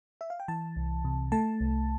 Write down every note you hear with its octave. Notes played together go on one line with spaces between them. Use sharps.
E5
F5
G5
E3 A5
C2
C3
A3 A5
C2